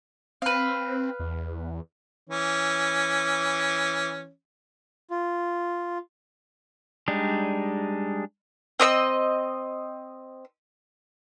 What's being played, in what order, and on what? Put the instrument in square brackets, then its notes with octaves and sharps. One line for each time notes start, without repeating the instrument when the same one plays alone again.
[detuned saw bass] C4 [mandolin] B4 F5
[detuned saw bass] E2
[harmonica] E3 C#4
[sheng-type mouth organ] F4
[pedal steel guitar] G3 G#3 D4 D#4
[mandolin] C4 D#5 E5 E6